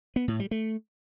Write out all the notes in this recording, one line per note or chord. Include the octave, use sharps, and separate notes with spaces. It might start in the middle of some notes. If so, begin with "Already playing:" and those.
B3
A2
G3
A3